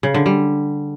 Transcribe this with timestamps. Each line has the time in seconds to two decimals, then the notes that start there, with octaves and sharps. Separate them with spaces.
0.03 C#3
0.14 D3
0.26 G3